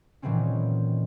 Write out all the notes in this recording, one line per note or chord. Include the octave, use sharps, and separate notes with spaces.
A#2 D#3 E3 F#3 C4 C#4